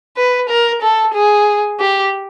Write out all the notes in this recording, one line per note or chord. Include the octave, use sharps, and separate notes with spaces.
B4
A#4
A4
G#4
G4